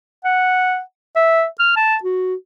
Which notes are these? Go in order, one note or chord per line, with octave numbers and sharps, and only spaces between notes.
F#5
E5
F6
A5
F#4